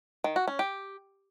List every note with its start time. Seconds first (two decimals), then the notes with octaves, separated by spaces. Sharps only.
0.24 D#3
0.36 F#4
0.48 C#4
0.59 G4